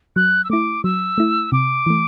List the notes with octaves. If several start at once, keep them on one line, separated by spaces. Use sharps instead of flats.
F#3 F#6
E6
A3 E4 D6
F#3 E6
A3 E4
C3 D6
E3 A3